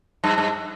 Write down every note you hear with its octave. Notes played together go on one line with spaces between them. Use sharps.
G2
G2